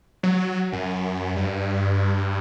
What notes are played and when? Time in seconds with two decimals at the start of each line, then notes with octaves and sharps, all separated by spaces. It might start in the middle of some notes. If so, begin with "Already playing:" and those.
0.23 F#3
0.72 F#2
1.36 G2